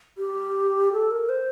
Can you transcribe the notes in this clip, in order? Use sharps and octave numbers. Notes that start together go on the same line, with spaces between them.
G4
A4
A#4
C5